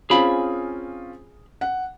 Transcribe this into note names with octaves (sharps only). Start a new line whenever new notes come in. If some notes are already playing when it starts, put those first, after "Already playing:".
C4 C#4 F4 G#4 B5
F#5